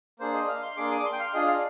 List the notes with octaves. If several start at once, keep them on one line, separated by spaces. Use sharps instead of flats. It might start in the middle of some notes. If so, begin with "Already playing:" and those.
A#3 D4 G#4 C5
D#5
F5
C6
A#3 D4 G#4 D6
D#6
D6
C6
G5
F5
D4 F4 G#4 D#5
F5